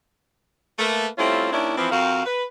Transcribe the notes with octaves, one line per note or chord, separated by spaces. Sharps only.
A3 A#3 B4
G3 A3 C4 C#4 E4 F4
D#2 D#3 C#4 D4 E4
E3 F3 C4
F2 C4 F#4 A#4 F5
B4